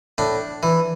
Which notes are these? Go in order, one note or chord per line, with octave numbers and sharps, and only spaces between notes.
A2 D4
E3